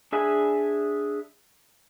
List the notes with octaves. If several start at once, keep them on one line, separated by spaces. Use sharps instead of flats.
D4 G#4 E5 G#5 B5